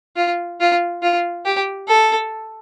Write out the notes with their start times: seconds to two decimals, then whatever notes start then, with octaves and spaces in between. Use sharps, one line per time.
0.16 F4
0.60 F4
1.02 F4
1.46 G4
1.88 A4